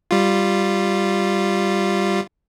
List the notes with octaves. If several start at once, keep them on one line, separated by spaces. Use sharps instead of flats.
G3 F4